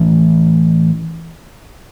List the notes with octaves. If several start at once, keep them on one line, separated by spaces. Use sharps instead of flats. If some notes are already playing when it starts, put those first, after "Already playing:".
Already playing: A2 E3 A3 C#4